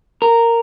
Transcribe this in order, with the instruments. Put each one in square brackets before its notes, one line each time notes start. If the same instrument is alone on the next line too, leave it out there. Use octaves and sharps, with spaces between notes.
[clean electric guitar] A#4